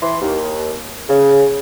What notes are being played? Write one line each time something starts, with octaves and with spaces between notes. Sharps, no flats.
E3 C6
D#2
C#3